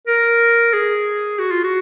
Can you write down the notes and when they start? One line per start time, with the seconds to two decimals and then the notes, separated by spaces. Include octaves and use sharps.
0.08 A#4
0.73 G#4
1.39 F#4
1.51 F4
1.64 F#4